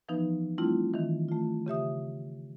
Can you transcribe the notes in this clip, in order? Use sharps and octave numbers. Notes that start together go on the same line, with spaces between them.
E3 F3 B3 D#4 B4
G3 A3 C4 D4 E4 F4
D#3 E3
A3 F4
C#3 G4 E5 D#6